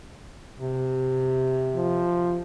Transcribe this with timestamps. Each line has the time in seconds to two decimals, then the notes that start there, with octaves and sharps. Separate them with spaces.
0.58 C3
1.76 F3